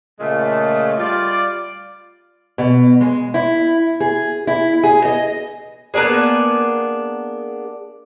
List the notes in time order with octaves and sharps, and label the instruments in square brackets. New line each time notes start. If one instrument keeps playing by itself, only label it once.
[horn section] A#2 C#3 G#3 A3
G3 F4 D5
[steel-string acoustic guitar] B2
G#3
E4
G#4
E4
G#4
D#5
[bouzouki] A#3 B3 D4 G#4